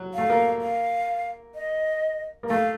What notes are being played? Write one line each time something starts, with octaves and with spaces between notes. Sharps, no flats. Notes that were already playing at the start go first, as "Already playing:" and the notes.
Already playing: F#3
A3 F5
A#3
F5
D#5
A#3
A3 F5